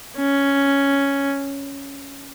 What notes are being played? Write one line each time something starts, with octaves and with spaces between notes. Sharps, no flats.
C#4